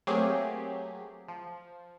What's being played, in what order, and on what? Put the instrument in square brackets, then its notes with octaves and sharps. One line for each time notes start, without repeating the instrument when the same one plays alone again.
[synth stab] F#3 A3 A#3 C4 G4 G#4
F3